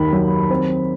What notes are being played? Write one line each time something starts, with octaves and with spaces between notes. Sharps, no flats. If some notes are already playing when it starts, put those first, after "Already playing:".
Already playing: D#2 D#3 B5
F#3
C4